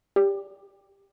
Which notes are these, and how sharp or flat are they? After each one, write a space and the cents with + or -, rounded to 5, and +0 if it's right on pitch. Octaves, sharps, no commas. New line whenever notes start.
G4 +15 D5 -20